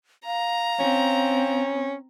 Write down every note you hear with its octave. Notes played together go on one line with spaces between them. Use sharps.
F5 A#5
C4 C#4